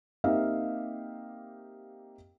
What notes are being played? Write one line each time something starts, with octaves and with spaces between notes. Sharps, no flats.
A#3 C4 D#4 G4 E5 F5